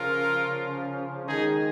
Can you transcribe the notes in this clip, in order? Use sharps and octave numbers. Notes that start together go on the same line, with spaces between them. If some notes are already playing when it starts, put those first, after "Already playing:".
Already playing: C#3 F3 C#4 F4 A#4
D#3 G#3 C#4 D#4 G#4